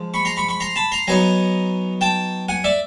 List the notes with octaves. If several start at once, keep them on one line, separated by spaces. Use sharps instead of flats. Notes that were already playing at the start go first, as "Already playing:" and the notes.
Already playing: F3 G#3
B5 C#6
A#5 C6
B5 C#6
B5 C#6
A#5 C6
A5 B5
A#5 C6
F#3 B3 D#4 G#5 A#5
G5 A5
F#5 G#5
D5 E5